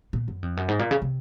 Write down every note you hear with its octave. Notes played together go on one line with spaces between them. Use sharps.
A#2
F#2
F2
F#2
G#2
A#2
C#3
C3